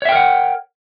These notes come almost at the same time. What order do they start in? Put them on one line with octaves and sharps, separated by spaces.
C#5 E5 G5 A#4 F#5